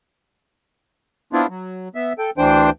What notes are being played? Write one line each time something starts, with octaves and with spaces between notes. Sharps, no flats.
B3 C4 D4 E4 F4
F#3
B3 E5
A4 G5
D2 E3 D4 C5 G5